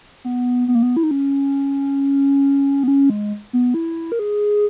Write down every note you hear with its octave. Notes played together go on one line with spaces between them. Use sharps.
B3
B3
A#3
B3
E4
D#4
C#4
B3
C#4
G#3
B3
E4
A#4
G#4